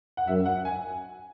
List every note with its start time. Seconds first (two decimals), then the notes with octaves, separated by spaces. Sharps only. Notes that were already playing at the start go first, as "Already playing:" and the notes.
0.17 F#5
0.28 F#2 E5
0.46 F#5
0.65 G#5